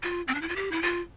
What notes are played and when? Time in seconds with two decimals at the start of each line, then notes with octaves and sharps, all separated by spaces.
0.03 F4
0.28 C4
0.35 D4
0.42 E4
0.49 F4
0.56 G4
0.72 E4
0.82 F4